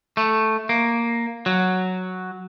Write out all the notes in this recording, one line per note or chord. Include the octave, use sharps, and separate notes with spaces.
A3
A#3
F#3